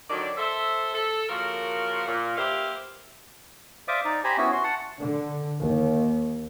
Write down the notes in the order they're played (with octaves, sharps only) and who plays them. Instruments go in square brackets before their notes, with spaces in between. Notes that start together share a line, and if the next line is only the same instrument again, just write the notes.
[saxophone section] D3 D#3 F#3 D4 D5
A4 C5 E5
A4
C#3 F3 A#3 F#4 A#4
A#2
A#3 G4 B4 C5 E5 F5
[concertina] C5 D5 E5 F5 D6 D#6
D#4 D5
G4 C5 G#5 A#5 B5
B3 C#4 E4 F#4
F#4 C6
F#5 A5
[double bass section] D3
D#2